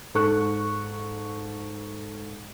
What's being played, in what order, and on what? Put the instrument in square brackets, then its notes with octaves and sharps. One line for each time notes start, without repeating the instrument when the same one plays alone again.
[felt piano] G#2 A4 C#6 F#6